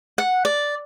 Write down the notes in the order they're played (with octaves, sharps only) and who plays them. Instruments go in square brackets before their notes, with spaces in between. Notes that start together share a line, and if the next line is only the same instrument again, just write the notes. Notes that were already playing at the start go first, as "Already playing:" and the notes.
[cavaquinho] F#5
D5